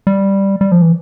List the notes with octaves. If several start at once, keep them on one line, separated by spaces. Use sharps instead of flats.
G3
G3
F3
E3